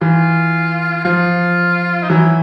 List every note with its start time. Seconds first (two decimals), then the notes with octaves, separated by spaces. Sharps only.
0.01 E3 F4
1.05 F3 F4
2.03 D#4
2.09 E3 F#3 E4